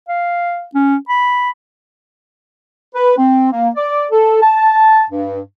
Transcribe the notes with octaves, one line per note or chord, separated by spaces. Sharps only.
F5
C#4
B5
B4
C4
A#3
D5
A4
A5
G2